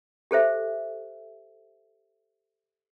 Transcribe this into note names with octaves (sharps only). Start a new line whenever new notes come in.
G4 A4 C5 E5